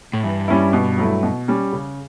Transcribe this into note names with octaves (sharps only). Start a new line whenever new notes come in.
A2
G2 E3
G3 C#4 E4
B2
F#3 A3 E4
B2
G3 C#4
C#3